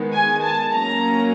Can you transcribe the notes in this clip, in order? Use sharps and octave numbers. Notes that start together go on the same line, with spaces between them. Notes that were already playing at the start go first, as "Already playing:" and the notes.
Already playing: D#3 G#3 B3
G#5
A5
F#3 A#3 C#4 A#5